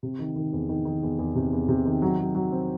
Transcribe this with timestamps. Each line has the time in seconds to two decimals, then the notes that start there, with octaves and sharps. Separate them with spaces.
0.03 C3
0.19 D#3
0.36 D#3
0.53 E2
0.69 D#3
0.85 D#3
1.03 E2
1.19 E2
1.35 C3
1.53 E2
1.69 C3
1.85 D#3
2.02 F#3
2.19 F#3
2.35 F#3
2.52 C4